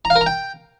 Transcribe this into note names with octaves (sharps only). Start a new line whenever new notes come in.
A#5
F5
A#4
A#5
G5